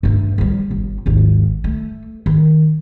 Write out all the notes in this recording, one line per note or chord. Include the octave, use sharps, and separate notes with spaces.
G2 A3
F3 G3
G1
G#1 D#2
A3
D#3